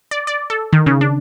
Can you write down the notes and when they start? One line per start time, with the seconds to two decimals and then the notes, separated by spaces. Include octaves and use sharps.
0.11 D5
0.27 D5
0.50 A4
0.73 D#3
0.86 C#3
1.01 D4